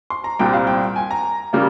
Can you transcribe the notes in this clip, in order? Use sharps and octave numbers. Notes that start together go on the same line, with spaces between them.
C6
A#5
C2 A#2 G3 C4 G5
F5
G5
G#5
A#5
C#3 G3 A#3